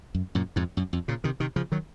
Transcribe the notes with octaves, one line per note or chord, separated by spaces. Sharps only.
F#2
F#2 A#2
F2 G#2
F#2
F2
A#2 C#3
C3 D#3
C3 D#3
C#3 F3
D#3 F#3